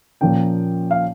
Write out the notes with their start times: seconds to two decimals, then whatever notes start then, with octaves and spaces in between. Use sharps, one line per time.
0.21 A#2 F3 A#3 C#4 G5
0.91 F5